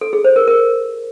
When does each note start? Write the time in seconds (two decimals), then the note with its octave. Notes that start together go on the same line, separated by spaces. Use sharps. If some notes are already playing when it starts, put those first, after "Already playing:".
0.01 A4
0.13 G#4
0.24 C5
0.36 A#4
0.48 A#4